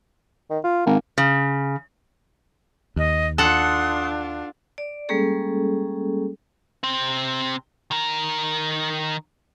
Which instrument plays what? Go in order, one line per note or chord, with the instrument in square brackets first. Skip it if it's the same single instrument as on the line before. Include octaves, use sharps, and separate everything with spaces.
[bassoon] D#3
F4
[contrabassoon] G#1 [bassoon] A#3
[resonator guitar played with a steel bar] C#3
[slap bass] D#2 [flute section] D#5
[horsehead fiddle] D4 F4 [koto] A4 F#5 [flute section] C6 D#6 F#6
[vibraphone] D5
G3 G#3 A#3 C#4 G#4 A4
[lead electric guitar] C3 C4
D#3 A#4